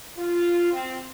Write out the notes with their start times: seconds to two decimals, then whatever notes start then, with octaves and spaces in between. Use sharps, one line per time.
0.16 F4
0.72 C4